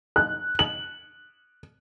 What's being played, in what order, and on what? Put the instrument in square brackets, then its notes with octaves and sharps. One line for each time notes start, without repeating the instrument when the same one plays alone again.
[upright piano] F#6
F#7